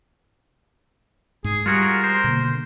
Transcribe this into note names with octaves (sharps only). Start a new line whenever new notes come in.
G#2 G#4
G3 F4 F#4 G#4 A#4
C5
B2 D3 A#3